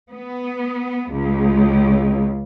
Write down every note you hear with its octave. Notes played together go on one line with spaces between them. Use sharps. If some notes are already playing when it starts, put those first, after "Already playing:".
B3
C#2